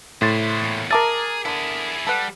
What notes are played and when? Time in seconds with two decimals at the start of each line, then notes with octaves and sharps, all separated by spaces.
0.22 A2 E4 C5 C6 A6
0.61 E2 A#2
0.91 G#4 A#4 E5 A5 A#5 D6 A6
1.45 D3 E4 G#4
2.07 G3 A4 B4 F#5